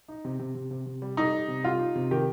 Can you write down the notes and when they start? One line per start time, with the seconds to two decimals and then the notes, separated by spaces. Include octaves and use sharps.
0.08 D#4
0.25 C3
0.39 C3
0.55 C3
0.71 C3
0.86 C3
1.02 G3
1.17 G3 D#4
1.33 G3
1.48 C3
1.64 G3 F4
1.79 D#4
1.96 C3
2.11 D#3 G4